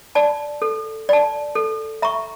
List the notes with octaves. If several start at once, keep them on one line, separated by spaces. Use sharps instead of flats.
D5 A5
A4
D5 A5
A4
E5 A#5 C#6